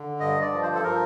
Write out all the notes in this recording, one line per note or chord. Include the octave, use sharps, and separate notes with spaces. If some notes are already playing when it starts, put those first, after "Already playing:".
Already playing: D3
G2 D#5
D5
F3
C5
A4
F3 A#4